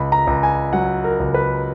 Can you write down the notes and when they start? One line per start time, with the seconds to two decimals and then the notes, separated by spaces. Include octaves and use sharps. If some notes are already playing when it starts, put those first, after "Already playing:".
Already playing: C#2 B5
0.12 A#5
0.27 C#2
0.43 G#5
0.73 F#3 F#5
1.04 A#4
1.20 C#2
1.34 B4